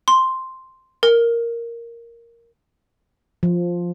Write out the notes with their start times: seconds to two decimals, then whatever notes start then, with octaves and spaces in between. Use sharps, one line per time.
0.08 C6
1.03 A#4
3.43 F3